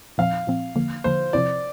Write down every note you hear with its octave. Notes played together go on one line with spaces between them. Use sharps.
A#2 F3 C4 F5
A#2 F3 C4
D3 F3 A#3
D3 F3 A#3 C5
C3 F3 C4 E4 D5